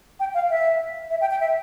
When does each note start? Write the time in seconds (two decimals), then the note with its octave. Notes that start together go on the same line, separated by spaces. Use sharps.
0.20 G5
0.34 F5
0.50 E5
1.10 E5
1.21 G5
1.31 G5
1.40 E5